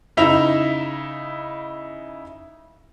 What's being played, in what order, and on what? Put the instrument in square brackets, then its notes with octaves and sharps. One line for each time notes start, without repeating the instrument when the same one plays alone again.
[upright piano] C#3 D#4 E4 E5 F7